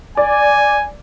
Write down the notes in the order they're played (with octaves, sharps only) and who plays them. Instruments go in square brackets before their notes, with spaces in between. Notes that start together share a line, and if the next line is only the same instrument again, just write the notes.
[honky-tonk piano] D5 [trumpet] G#5